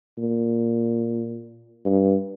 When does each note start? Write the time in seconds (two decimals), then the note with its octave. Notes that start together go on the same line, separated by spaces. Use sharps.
0.18 A#2
1.85 G2